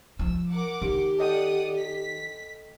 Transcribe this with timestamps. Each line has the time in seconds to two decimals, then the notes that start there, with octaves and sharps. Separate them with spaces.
0.19 F3 E6
0.49 A#4 F#5 D6
0.82 D#3 G4
1.19 A4 D5 D#5 F#5 G5 D#6
1.77 B6